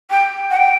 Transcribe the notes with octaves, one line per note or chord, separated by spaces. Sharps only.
G5
F#5
G5